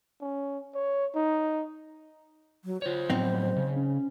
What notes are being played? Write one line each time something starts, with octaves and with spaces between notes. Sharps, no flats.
C#4
C#5
D#4
F#3
F4 C5 C#5
A2 F3 F#3 B3 C4 D#4
C#3
C#4